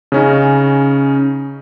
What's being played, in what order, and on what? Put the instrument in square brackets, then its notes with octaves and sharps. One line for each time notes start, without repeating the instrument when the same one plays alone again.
[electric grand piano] C#3 C#4 D#4